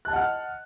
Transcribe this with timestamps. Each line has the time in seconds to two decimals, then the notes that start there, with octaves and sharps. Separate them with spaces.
0.05 F#6
0.08 A5
0.11 D#5
0.13 F#5
0.16 F6